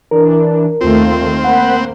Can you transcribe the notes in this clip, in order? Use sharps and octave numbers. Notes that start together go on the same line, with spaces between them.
E3 D4 A#4
D#2 D#3 A3 C4 F4
A#3 C5 F#5 B5 F#6